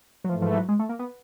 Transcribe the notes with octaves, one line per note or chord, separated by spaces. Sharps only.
F#3
G#2 E3 F3 A3
F3
F#3
G#3
A3
A#3
B3